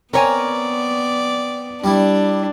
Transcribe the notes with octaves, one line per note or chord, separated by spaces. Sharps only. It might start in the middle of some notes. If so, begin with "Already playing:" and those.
B3 C4 A#4 C#5 D5 G#5
G3 D4 E4